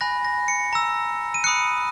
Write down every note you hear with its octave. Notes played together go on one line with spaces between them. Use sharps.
G#5 B5 F#6 A#6
A#6
C#7
A#5 E6
D#7
B5 D#6 F#6 C#7